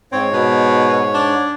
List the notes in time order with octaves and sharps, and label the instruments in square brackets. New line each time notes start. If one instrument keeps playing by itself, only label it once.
[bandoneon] G#2 C#5 [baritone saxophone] C4
[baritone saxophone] B2
D4